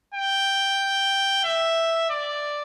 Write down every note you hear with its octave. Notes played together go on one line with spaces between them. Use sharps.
G5
E5
D5